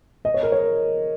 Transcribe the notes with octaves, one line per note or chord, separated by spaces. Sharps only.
D#5
C#5
A#4
C#5